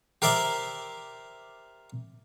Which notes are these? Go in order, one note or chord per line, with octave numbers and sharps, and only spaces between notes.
G4 A#4 C5 D5 E5